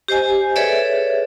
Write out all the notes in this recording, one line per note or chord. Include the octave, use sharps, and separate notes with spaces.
G4 C5 D#5 G#5
G#4 A4 B4 C#5 D5 E5